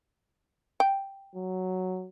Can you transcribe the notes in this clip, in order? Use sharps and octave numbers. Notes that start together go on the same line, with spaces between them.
G5
F#3